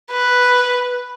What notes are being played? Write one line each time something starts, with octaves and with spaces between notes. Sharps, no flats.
B4